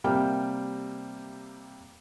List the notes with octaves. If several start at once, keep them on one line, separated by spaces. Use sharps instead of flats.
C3 G3 A#3 G5 F6